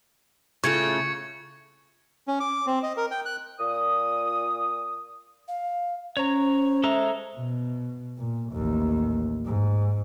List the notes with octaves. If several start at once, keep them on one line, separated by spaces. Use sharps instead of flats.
C#3 A3 F4 C#6 G#6 C#7
C#4
D6
C4
D#5
A#4
G5
F#6
A#2 D#6
F5
C#4 C5 C#5 A#5
G#3 A4 E5 A#5
B2
A#2
A1 D#2
G#2